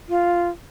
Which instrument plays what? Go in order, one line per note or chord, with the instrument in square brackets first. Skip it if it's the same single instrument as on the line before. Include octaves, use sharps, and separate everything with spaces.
[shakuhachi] F4